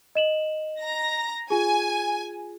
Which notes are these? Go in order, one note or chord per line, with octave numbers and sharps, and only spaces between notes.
D#5 E7 F#7
A#5 A#6
F4 G#4 G#5